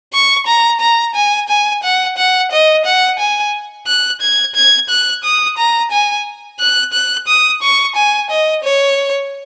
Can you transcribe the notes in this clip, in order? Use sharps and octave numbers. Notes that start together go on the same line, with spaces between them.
C#6
A#5
A#5
G#5
G#5
F#5
F#5
D#5
F#5
G#5
F#6
G#6
G#6
F#6
D#6
A#5
G#5
F#6
F#6
D#6
C#6
G#5
D#5
C#5